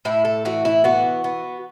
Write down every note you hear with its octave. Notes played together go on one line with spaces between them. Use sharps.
A2 E4
A4
E3 F#4
E4
B3 F#4
B3